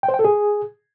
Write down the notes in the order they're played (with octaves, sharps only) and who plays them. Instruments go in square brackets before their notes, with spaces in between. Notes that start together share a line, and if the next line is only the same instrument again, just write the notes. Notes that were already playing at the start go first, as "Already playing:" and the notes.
[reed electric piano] G5
C5
G5
A4
G#4